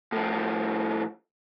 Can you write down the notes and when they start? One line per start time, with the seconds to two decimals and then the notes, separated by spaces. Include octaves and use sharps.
0.12 A2 F3